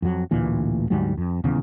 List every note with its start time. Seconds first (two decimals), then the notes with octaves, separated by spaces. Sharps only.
0.02 F2 F#3
0.31 A1 D2 A#2 E3
0.90 D2 G#2 F#3 G3
1.17 F2
1.44 D#1 E2 C#3